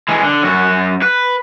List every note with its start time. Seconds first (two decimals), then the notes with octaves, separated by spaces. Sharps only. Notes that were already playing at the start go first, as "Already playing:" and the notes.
0.08 E3 G#3
0.24 D3
0.43 F#2 F#4
1.02 B4